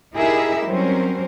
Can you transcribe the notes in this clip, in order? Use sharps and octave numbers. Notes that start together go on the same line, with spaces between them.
D#4 E4 G4 G#4 A#4 E5
F#3 G3 C4 C#4 A#4 C5